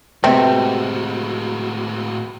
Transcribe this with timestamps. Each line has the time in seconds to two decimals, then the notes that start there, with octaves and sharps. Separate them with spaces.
0.24 A2 C3 G#3 A3 B3 C4 F#4